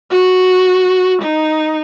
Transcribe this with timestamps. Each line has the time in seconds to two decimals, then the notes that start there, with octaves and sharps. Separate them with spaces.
0.11 F#4
1.22 D#4